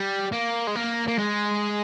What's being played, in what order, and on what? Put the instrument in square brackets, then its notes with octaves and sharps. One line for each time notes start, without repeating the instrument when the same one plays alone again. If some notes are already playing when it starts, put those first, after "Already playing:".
Already playing: [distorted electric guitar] G3
A#3
G#3
A#3
A#3
G#3